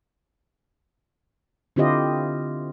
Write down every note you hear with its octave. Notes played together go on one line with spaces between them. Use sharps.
D3 C4 E4 F4 G4 D#5